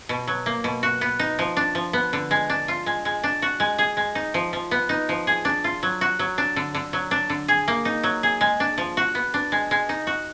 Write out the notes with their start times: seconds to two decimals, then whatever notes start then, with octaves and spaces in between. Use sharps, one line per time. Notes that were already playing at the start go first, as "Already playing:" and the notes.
0.09 B2
0.28 F#3
0.46 A#3
0.64 B2
0.83 F#4
1.01 B3
1.19 D#4
1.39 F3
1.57 D4
1.75 F3
1.93 B3
2.13 D3
2.31 G#3
2.50 D4
2.68 F4
2.86 G#3
3.05 G#3
3.24 D4
3.42 F#4
3.60 G#3
3.79 G#4
3.97 G#3
4.15 D#4
4.34 F3
4.53 F3
4.71 B3
4.89 D#4
5.09 F3
5.27 G#4
5.45 D4
5.64 F4
5.83 F#3
6.01 F#4
6.19 F#3
6.38 D4
6.56 D3
6.75 D3
6.93 F#3
7.11 D4
7.30 D3
7.48 G#4
7.68 A#3
7.85 D#4
8.04 F#3
8.23 G#4
8.41 G#3
8.60 D4
8.78 F3
8.97 F#4
9.15 B3
9.34 D4
9.52 G#3
9.71 G#3
9.89 D#4
10.07 F#4